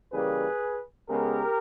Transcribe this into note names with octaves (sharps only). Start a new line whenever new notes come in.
C#3 E3 G3 A#3 G#4 B4
C#3 G#3 B3 G4 A#4